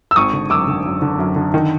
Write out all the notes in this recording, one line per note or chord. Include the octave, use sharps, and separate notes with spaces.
E6
G#1 C#6 D#6
D3
F#2 D6 E6
D3
F#2
D3
F#2
D3
D#3